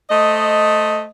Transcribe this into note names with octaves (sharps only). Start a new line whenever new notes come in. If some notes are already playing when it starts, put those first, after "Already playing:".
A3 C5 D#5